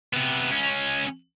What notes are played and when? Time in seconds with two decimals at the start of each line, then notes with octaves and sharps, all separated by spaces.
0.13 C3 B3
0.50 C#2 C#4